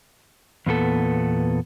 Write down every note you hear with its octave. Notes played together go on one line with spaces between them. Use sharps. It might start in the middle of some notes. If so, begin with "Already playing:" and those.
E2 A#2 B3 A4